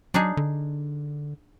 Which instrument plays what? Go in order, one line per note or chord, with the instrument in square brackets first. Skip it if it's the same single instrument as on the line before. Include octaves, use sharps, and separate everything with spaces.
[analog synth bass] F#3 [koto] D4 D#4 G#4
[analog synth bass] D3